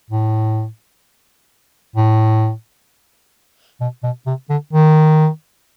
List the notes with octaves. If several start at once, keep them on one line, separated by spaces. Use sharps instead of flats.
A2
A2
B2
B2
C3
D3
D#3